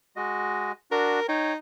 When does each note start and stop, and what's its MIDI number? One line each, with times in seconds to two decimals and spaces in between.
0.16 0.72 56
0.16 0.72 66
0.16 0.72 75
0.91 1.20 62
0.91 1.20 66
0.91 1.28 70
1.28 1.55 63
1.28 1.54 73
1.28 1.54 79